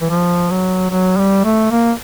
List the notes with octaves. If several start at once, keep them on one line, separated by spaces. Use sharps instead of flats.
E3
F3
F#3
F#3
G3
A3
A#3